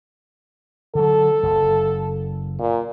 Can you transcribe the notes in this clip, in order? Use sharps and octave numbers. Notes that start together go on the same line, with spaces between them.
D3 F#3 A4
F#1
A#2